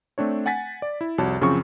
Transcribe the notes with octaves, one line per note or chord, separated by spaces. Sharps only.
A3 C4 D4 C#5
F#5 G#5 A6 B6
D5
E4
C2 F2 F#4 C#5 A5
F#2 C#3 F3 C4 C#6